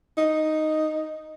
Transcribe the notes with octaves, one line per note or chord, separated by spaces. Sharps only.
D#4